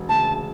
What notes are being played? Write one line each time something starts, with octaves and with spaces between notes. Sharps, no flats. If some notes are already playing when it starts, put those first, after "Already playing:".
Already playing: E1
D2 C#3 A5